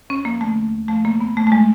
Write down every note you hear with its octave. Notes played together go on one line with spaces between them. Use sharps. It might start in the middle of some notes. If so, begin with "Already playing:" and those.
F2 C#4
F3 A#3
D3 A3
D#2
D#2
F3 A3
C#3 A#3
F2 B3
F2 A3
A3
F#3 G#3